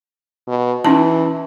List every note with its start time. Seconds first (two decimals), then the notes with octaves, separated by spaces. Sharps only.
0.48 B2
0.85 E3 C#4 D#4 A5